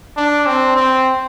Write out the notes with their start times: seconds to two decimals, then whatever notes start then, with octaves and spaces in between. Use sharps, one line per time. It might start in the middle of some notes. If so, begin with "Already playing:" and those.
0.17 D4
0.46 C4
0.76 C4